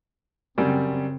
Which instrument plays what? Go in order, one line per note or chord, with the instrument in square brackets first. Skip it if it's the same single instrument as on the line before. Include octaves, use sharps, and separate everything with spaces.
[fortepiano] F#2 G3 [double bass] C#3 C4